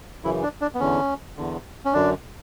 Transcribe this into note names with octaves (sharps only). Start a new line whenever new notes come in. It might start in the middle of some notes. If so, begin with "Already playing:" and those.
F#2 C#3 E3 E4
D4
D4
B3
E2 D3 C#4
E2 D3
C#4
F#2 D3 D4